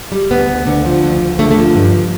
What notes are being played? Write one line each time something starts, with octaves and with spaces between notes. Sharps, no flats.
G3
D2 B3
D2
D3
F3
D2
D2
D3 A3
A3
F3
G2